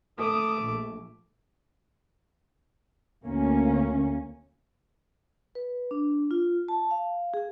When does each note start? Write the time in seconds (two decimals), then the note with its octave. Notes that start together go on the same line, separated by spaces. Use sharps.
0.18 A3 D6 D#6
0.61 A#1
3.25 D2 A#3 C#4
5.55 B4
5.91 D4
6.31 F4
6.68 A5
6.91 F5
7.34 G#4